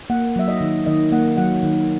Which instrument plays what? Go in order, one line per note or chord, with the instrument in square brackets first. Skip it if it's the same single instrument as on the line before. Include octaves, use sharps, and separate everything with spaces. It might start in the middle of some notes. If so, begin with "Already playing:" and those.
[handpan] A#3 F#5
F#3 E5
D#5
D#3
D#3 D#5
A#3 F#5
F#3 F#5
D#3